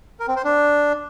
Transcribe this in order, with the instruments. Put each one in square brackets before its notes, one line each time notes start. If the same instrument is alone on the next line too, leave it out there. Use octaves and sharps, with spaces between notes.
[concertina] A#4
C4
C5
D4